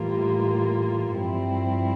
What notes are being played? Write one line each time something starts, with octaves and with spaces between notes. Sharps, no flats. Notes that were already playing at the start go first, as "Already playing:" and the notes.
Already playing: A2 E3 G3 A#3 F4
G2 F3 C4 E4